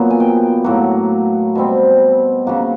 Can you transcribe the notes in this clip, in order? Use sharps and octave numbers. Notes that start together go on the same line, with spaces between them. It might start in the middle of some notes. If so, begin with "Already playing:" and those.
Already playing: A#2 F#3 B3
G#5
G5
A2 F#3 A#3 F#5
B2 G3 C4
C#3 F#3 A#3 F#5